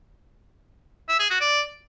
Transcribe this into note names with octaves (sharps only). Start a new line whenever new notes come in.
E5
G#4
F#4
D5